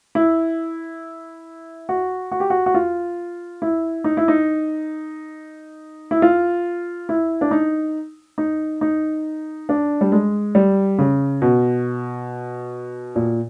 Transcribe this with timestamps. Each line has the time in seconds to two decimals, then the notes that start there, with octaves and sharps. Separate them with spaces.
0.15 E4
1.89 F#4
2.32 F#4
2.40 G4
2.50 F#4
2.66 F#4
2.74 F4
3.62 E4
4.04 D#4
4.17 E4
4.28 D#4
6.11 E4
6.22 F4
7.09 E4
7.41 D4
7.51 D#4
8.38 D#4
8.81 D#4
9.69 D4
10.01 G3
10.12 G#3
10.55 G3
10.98 C#3
11.42 B2
13.16 A#2